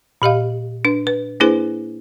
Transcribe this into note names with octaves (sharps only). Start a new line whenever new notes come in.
A#2 G4 D#5 F5
D4 B4
B4
A#3 D4 E4 G#4 B4 C5